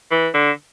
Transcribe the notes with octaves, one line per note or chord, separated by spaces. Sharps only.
E3
D3